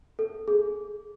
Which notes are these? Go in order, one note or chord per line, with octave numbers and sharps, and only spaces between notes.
A4
G#4